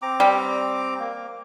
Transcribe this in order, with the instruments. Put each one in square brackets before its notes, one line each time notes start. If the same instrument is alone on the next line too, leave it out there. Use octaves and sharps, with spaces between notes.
[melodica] C4 A#5 D6
[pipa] G3
[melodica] A#3